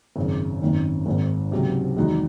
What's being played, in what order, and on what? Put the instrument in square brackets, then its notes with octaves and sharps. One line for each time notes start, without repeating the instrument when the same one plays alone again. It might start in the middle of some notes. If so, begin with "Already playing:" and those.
[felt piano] G#1 F#2 C#3
G#1 F#2 D#3
G#1 G#2 D#3
C#2 C3 F#3 C4
E2 D#3 G#3 D#4 F#4